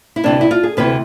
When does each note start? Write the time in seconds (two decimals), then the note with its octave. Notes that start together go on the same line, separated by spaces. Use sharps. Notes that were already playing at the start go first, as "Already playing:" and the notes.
0.16 E4
0.24 D2 C3 E3 D4
0.41 E4
0.51 F4
0.63 G#4
0.77 D2 C3 E3 B4